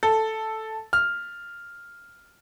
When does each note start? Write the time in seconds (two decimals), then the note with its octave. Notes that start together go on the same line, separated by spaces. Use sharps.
0.03 A4
0.93 F6